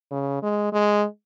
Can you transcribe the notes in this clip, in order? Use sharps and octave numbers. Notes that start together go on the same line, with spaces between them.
C#3
G#3
G#3